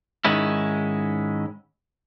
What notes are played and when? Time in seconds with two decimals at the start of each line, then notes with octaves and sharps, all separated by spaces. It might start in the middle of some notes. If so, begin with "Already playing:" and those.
0.25 G#2 D#3 G#3 C#4 E4